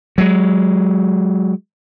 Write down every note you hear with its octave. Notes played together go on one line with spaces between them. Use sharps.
F#3 G#3